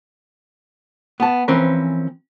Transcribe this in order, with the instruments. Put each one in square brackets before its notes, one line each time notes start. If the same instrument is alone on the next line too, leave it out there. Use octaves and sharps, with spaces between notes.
[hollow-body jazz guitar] B3 A5
E3 F3 C4 C#4 A#4 B4